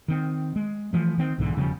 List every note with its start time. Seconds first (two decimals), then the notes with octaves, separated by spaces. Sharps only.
0.08 D#3 C4
0.56 G#3
0.93 E3 F3 A3
1.18 D#3 C4
1.38 B1 G#2 D3 E3
1.57 E1 C#3 F3 G3